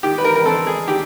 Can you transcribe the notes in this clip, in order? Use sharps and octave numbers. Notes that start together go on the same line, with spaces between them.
D#3 G4
B4
A#4
A#4
C4 A4
G#4
D#3 G4